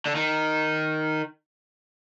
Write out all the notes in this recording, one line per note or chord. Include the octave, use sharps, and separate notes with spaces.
D3
D#3